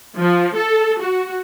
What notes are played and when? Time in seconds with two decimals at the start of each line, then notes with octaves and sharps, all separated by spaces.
0.18 F3
0.56 A4
1.01 F#4